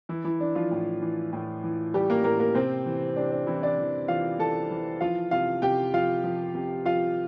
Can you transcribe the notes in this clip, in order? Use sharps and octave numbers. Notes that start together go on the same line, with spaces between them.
E3 E4
E3 E4
E3 D4
F3 F4
A2
E3
A2
E3
E3 G3 G4
A#3 A#4
A2 A#3 A#4
A#3 A#4
C3 C4 C5
E3
C3 D4
D4
C3 E3 E4
D4 D5
E3
E3 F4 F5
E3 A4 A5
E3
F3 F4 F5
C3 F4 F5
C3 G4 G5
F3 F4 F5
F3
C3
F3 F4 F5